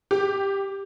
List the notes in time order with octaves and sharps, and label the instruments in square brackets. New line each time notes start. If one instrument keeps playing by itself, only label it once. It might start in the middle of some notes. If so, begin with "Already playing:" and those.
[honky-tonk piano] G4